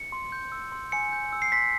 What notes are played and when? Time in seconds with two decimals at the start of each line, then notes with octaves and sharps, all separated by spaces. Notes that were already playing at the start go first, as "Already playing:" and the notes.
Already playing: C#7
0.12 C6
0.32 G6
0.52 E6
0.72 C6
0.92 G#5 C#7
1.12 G6
1.33 E6
1.42 C7
1.52 C6 B6